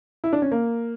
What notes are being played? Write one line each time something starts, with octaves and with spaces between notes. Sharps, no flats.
E4
D4
C#4
A#3